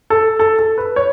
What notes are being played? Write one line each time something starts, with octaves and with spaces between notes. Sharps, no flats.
A4
A4
A4
B4
C#5